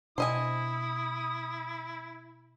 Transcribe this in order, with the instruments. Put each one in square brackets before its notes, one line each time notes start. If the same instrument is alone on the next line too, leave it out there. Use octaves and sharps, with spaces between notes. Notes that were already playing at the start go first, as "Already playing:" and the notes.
[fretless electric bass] B2 D4 [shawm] E4 [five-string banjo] C5 D#5 G#5 [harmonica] D#6